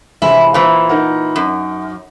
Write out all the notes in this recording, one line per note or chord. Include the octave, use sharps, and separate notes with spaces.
C3 E3 G#3 E4
A#2 E3 C5
D#4 A#4 F#5
F#2